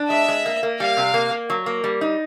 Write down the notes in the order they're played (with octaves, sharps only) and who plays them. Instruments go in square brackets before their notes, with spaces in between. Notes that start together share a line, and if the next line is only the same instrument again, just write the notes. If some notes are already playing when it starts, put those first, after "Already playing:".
Already playing: [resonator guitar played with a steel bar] D4
[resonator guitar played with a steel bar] G#3 [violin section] E5
[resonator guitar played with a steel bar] G#3
A#3
A#3
[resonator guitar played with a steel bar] G3 [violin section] F5
[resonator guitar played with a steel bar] C3
A#3
A#3
F#3
A#3
G3
D#4